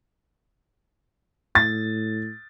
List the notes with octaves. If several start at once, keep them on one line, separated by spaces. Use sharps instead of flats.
A2 A6